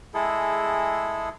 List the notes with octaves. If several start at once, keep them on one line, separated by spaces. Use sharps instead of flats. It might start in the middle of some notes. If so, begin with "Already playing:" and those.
G#3 E4 G#4 A4